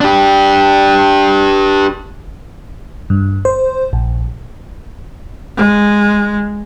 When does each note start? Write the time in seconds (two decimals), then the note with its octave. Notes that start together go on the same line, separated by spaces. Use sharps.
0.01 D4 G4
3.10 G2
3.45 C5
3.93 A#1
5.57 G#3